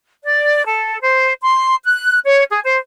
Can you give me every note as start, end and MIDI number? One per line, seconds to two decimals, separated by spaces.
0.23 0.61 74
0.67 0.98 69
1.00 1.33 72
1.41 1.75 84
1.85 2.18 90
2.26 2.43 73
2.50 2.60 68
2.64 2.78 72